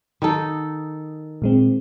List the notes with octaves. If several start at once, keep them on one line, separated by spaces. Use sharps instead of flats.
D#3 D#4 A4
A#2 G#3 C4